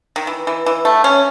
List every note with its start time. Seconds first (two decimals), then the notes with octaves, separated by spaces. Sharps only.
0.16 D#3
0.27 E3
0.47 E3
0.66 E3
0.85 A3
1.04 C#4